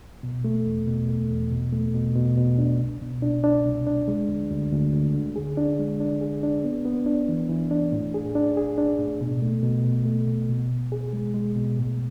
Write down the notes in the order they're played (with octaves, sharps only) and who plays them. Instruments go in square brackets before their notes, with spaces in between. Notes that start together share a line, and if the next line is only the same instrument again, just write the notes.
[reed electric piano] B2
A3
E2
B2
A3
E2
B2
A3
B2
B2
B2
D4
C2
B2
D4
D4
C2
D4
G#3
D2
D2
D2
D2
D3
G#4
D4
G#3
D4
G#4
D4
B3
B3
D4
E3
E3
D4
A2
G#4
D4
G#4
D4
A2
B2
A3
B2
B2
A3
B2
B2
B2
G#4
G#3
G#3
B2
A2